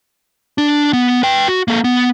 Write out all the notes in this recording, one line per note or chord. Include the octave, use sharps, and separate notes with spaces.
D4
B3
B4 G5
F#4
A#3 A4
B3